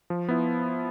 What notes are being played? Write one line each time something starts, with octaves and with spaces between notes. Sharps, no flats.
F3
B3 E4